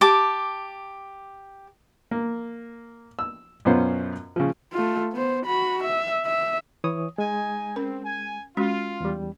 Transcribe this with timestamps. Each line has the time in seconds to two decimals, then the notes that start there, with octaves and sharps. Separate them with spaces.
0.01 G4 A5 D6
2.11 A#3
3.19 E6
3.65 F#2 B2 B3 C#4 F4 C5
4.36 C#3 F3
4.73 A3 F4
5.12 B3 C5
5.46 F#4 B5
5.83 E5
6.26 E5
6.84 E3 C#5 D#6
7.18 G#3 D#4 D#5 G#5
7.76 C4 C#4 A#4
8.05 G#5
8.57 G#3 C#4 F4 F#4
9.00 E2 G3